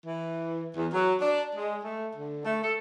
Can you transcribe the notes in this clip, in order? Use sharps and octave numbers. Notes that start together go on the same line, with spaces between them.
E3
E2
F#3
D4
G#3
A3
D3
A3
A4